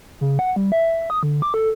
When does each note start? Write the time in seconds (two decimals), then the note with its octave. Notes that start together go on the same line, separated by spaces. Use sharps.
0.21 C#3
0.39 F#5
0.56 G3
0.72 E5
1.10 D#6
1.23 D3
1.42 D6
1.54 A4